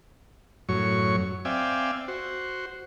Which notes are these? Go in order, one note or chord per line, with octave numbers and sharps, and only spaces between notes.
F#2 A2 F#3 C#5 C#6
C4 D5 E5 F5 G5 G#5
F#4 C5